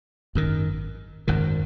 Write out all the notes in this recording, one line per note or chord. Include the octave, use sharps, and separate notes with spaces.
G#1 F#2 D#3
G#1 F#2 D#3